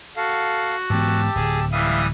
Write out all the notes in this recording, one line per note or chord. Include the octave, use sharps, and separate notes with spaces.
F#4 A4 F5
G#2 E3 B3 G4 A5 E6
D1 G#4
E3 G3 E5 F5 D#6